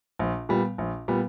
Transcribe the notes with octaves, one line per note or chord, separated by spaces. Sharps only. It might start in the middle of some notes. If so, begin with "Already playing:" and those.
A#1
A#2 G3 B3
A#1
A#2 G3 B3